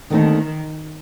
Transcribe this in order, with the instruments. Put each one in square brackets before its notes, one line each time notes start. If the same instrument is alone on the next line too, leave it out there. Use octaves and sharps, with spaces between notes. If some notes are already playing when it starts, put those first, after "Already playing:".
[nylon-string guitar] D#2 D3 A3 C4 D#4 [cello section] D#3